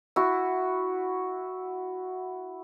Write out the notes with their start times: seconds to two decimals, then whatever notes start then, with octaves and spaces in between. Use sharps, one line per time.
0.16 E4 F#4